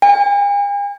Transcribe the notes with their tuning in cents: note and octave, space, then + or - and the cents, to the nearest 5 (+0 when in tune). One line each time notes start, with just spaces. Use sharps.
G#5 -45